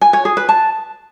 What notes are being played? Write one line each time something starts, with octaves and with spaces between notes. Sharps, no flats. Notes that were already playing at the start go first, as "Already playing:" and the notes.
G#5
C#5
G#4
B4
A5